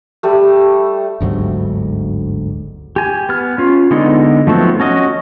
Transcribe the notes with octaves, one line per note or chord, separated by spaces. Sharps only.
G3 A3
G1 D2 G#2 F#3
G4 G#5
B3 F6
C#4 F4
D3 G#3 B3 D#4
F3 F#3 A3 B3 C4
C#4 F#4 D#5